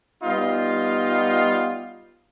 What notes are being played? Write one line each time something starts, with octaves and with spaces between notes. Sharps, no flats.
G3 B3 D#4 F4